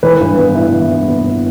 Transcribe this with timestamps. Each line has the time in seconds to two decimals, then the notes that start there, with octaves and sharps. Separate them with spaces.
0.03 E3 B4
0.20 G2
0.38 B3
0.55 E4
0.73 E3
0.90 G2
1.08 B3
1.25 E4